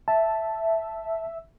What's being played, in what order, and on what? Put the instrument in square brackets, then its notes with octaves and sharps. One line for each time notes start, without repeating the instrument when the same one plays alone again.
[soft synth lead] E5 [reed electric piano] A5